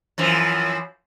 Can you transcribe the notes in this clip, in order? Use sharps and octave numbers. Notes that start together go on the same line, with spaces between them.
F#2 E3 F3